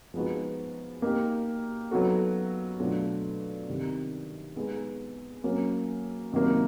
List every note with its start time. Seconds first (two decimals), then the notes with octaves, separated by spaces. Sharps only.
0.14 F3 G#3 B3 D#4 F#4
1.02 A#3 D#4 G4
1.91 F#3 B3 D#4 F#4 A4
2.79 B2 F#3 A3 D4 F4
3.67 C3 D#3 G3
4.56 G#3 B3 D#4
5.44 F#3 A#3 C#4
6.32 C3 D#3 F#3 A#3